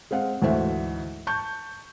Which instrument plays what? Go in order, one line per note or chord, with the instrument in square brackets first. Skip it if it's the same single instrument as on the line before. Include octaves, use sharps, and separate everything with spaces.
[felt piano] G#3 C4 F5 F#5
D2 G#2 E3 F#4 C5 E5
A5 C#6 G6